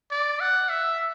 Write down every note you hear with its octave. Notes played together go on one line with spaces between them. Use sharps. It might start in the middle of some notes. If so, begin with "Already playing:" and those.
D5
F#5
E5